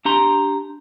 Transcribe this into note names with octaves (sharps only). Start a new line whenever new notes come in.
D4 G4 A#5 C6